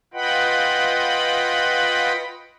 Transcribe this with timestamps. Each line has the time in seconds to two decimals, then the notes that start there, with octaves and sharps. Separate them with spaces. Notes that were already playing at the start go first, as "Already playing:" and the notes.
0.14 F4 B4 D#5 F#5 G5 B5